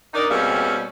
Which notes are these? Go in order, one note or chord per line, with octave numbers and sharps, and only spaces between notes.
D4 D#4 A#4 D5 D#5
B2 G3 G#3 A#3 C4 C#4